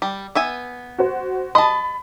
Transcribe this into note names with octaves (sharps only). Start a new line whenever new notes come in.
G3
B3 E5 G#5
F#4 C5
D#5 A5 B5